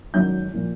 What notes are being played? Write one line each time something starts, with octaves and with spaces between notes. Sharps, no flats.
G#1 F#2 D#3 F#3 G6
A#2 F3